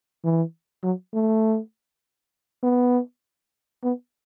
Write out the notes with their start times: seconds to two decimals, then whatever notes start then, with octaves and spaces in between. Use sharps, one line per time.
0.24 E3
0.83 F#3
1.14 A3
2.63 B3
3.83 B3